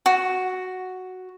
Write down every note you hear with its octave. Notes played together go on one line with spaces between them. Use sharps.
F#4